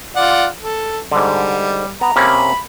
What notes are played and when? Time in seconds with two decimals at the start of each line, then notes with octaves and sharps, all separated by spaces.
0.16 F4 D5 F#5
0.63 A4
1.12 G#2 D3 G3
2.01 B3 A#5
2.16 C3 A#3 C#4 B5